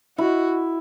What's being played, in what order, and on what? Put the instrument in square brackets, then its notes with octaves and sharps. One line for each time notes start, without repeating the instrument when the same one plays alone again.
[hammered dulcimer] E4 [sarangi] F#4